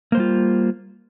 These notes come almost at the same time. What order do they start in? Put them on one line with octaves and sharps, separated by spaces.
A#3 C5 G3 F4